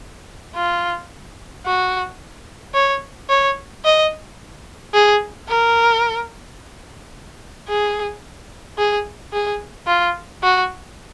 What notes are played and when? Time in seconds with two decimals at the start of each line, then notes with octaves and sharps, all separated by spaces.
0.56 F4
1.66 F#4
2.74 C#5
3.29 C#5
3.85 D#5
4.94 G#4
5.49 A#4
7.68 G#4
8.78 G#4
9.33 G#4
9.87 F4
10.43 F#4